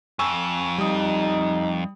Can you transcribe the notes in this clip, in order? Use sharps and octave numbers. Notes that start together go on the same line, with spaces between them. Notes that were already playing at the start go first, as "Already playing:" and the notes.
F2 G#5 C#6 E6
G3 D#4 D#6